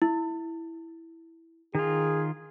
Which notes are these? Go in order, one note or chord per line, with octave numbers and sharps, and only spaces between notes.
E4
D#3 F4 G#4